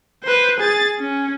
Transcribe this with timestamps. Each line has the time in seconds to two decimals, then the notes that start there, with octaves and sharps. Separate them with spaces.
0.23 B4 C5
0.60 G#4 A6
0.99 C#4